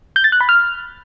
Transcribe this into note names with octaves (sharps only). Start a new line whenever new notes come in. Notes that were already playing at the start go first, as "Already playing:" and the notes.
G6
A6
F#6
B5
F6